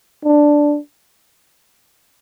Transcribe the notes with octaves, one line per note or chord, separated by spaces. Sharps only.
D4